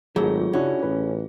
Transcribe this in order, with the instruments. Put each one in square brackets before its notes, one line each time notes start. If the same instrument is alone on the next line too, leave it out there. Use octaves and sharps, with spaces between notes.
[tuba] G#1 [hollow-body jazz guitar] F#3 A3 [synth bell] F4 G#4
[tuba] C#3 [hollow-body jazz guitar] C#4 [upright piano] D4 E4 F#4
[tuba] A1 [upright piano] B4